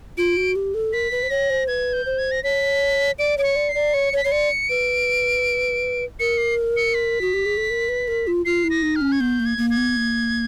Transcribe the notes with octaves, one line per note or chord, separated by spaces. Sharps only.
F4 D7
F#4
G4
A4
A#4 B6
B4
C5
C#5 A#6
C5
B4 G#6
G6
C5
G#6
A#6
C#5 B6
D5 D7
C#5 D7
C#7
D5
C7
D5
C#5 C#7
C#5
B6
C#5 C7
D5 C#7
B4 D7
A#4 C#7
C7
C#7
B6
F#4
G4
G#4
A4
A#4
B4
A#4
F4
F4 C7
E4
A#6
D#4
F6
C#4
G#6
B3 G6
A#3
G#6
A#3
G#6
B3
A#3